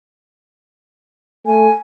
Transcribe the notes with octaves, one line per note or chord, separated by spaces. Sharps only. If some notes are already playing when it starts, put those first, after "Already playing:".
A3 G#5